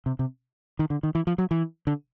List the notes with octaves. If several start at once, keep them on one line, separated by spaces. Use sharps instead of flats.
C3
C3
D#3
D3
D#3
E3
F3
F#3
E3
D3